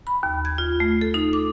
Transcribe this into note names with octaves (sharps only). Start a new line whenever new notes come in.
B5
D#2
G#6
F4
A3
A4
D#4
D6